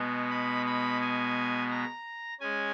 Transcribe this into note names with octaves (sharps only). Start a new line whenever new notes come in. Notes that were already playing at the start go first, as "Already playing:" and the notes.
Already playing: B2 G#3 B3
B5
B5
G#5
A#5
G#3 C#4 G#5